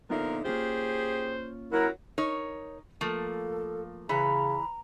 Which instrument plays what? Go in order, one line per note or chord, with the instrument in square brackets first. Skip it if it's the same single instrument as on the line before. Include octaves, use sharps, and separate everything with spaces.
[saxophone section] A#2 D3 F3 [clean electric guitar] B3 D#4 E5 [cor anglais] A#4
[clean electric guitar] A#3 C#4 F4 [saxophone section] G4 G#4 [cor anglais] C5
[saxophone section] F#3 [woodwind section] E4 A#4 [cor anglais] F#5
[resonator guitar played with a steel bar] D#4 A#4 C#5
[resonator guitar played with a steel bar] F3 A3 A#3 [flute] A4
[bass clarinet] C#3 [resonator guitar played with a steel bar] E3 [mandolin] B4 C#5 B5 [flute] A#5